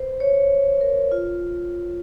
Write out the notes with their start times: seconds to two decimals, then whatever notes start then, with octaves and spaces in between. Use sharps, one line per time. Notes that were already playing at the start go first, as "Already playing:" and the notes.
Already playing: B4 C5
0.20 C#5
0.81 A#4
1.12 F4